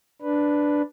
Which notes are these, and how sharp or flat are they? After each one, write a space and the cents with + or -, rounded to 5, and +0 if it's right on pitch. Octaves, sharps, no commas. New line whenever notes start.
D4 +0 B4 +0